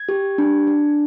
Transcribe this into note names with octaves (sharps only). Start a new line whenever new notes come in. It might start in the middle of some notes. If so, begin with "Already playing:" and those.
Already playing: G#6
G4
D4
D4